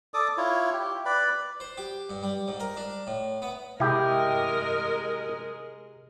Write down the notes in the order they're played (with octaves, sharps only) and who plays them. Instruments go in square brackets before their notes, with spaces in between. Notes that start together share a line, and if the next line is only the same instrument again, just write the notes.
[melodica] A4 D5 D6 D#6
E4 F4 C#5
G4
B4 D5 B5
[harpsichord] C5
G4
G2
G3
G#2
A#4
D4
A2
B3
[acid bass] C3 [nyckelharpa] G#3 [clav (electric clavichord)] E4 G4 [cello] A#4 D#5